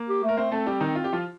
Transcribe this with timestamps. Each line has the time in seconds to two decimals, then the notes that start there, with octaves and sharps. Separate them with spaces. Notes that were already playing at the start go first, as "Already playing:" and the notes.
Already playing: A#3
0.09 G4
0.24 A3
0.29 A#4
0.37 A3 C4 C5
0.51 A3 C4 A4
0.66 G3 G4
0.80 D#3 D#4
0.95 F4
1.04 G4
1.13 F3 F4